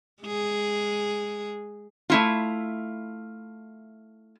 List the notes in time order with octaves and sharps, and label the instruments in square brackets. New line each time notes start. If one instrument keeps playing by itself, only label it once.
[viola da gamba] G#3 G#4
[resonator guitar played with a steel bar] A3 E4 F4